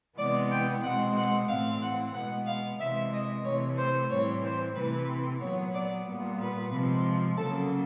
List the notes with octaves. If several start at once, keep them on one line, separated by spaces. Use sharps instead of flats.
C3 E3 G#3 B3 D5
G5
B2 G#3 C4 F#5
F#5
A2 E3 A3 C4 F5
F#5
B2 G#3 B3 F#5
F5
C3 E3 G#3 C4 E5
D#5
C3 E3 A3 C#5
C5
A2 E3 G3 C4 C#5
C5
C3 E3 A3 C4 B4
A#2 F#3 B3 C#5
D5
A#2 G3 B3
B4
C3 F3 G#3 C4
C#3 F#3 A#3 A4